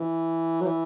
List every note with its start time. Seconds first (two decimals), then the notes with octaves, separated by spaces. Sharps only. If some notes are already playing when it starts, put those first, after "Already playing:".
Already playing: E3
0.61 F#3
0.66 E3